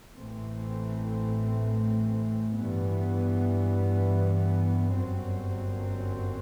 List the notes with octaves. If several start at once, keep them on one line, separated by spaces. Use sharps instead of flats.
A1 A2 E3 A3 C4
G2 E3 B3
G1 F#2 F#3 C4